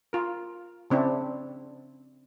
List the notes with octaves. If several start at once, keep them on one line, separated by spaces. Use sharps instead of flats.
F4 A#4
C#3 C4 D4 E4